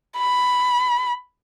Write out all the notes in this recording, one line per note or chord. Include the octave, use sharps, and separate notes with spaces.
B5